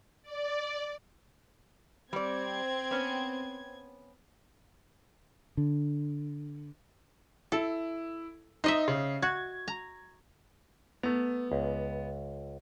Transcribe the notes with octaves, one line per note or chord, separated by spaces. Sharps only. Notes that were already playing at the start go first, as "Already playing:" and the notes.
D5
G3 C4 D5 G#6
B3 C#4
D3
E4 A4
D#4 C5 D#5 E5
C#3
F#4 G#6
A#5
A3 B3 A#5
C#2